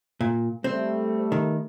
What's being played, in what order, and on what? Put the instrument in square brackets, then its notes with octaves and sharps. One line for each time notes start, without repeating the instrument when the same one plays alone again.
[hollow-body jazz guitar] A#2
[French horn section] G3 A3 [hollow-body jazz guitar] C4
[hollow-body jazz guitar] D#3